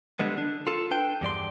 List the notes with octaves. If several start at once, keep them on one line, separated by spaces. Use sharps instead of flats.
D3 G3 G#3 B3
D4
F4 A4
D4 B4 G5
E2 G2 D5 C6